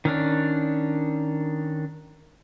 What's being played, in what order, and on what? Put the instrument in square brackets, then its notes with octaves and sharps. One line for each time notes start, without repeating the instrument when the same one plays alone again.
[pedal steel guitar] D#3 C#4 D4